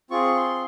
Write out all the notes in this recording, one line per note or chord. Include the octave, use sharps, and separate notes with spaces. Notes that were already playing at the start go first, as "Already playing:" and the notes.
C4 F4 G#4 C#6
C6